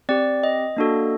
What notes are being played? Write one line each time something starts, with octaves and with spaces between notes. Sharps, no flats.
C4 G4 D5
D#5
A#3 D4 F#4 A4